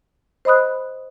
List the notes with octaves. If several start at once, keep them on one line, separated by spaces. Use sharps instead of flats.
C5 D#5 B5 D#6 F#6